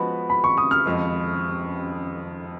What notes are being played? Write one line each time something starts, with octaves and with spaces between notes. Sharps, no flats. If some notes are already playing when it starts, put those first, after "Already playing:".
Already playing: F3 G#3 B3 F#4 B4 B5
B5
C#6
D#6
F6
F2 F3 G#3